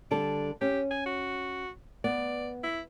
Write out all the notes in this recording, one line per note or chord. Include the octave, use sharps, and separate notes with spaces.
D3 G3 A4 D5
C#4 G4
G#5
F#4
B3 D5
E4